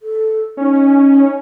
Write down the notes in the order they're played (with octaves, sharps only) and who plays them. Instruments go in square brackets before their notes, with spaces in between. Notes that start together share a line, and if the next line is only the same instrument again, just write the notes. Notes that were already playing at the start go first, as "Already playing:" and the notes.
[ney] A4
[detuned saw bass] C#4 [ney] D#4